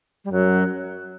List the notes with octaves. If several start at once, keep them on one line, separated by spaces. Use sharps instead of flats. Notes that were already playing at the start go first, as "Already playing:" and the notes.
G3
F#2 F#3